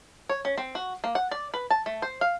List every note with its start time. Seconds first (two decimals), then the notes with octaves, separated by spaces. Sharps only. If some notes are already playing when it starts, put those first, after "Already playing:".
0.29 C#5
0.45 C#4
0.58 C4
0.75 F#4
1.04 A#3
1.15 F#5
1.31 D5
1.54 B4
1.70 A5
1.86 A3
2.02 C5
2.21 F5